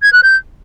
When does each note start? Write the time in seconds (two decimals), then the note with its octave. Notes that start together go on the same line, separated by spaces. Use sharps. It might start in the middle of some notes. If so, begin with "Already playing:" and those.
0.02 G#6
0.13 F#6
0.23 G6